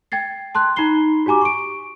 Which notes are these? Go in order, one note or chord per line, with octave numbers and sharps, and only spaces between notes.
G5 G#6 A6 C7
A5 C6 F#6
D#4 A#5 B5 C7 G7
F#4 G4 G#5 A#5 D6
C#6 D7